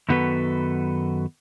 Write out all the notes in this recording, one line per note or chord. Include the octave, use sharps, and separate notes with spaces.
F#2 D#3 B3 F#4 A4 B4